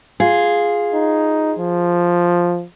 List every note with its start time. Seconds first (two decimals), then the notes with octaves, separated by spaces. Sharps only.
0.20 F4 G#4
0.94 D#4
1.59 F3